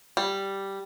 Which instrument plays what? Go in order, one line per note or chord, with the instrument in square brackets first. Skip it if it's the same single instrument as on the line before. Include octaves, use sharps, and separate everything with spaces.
[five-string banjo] G3